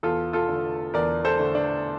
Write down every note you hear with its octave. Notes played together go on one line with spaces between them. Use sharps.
E2 F4 A4
F4 A4
D3 A3
E2 A#4 D5
A4 C5
D3 A3
D4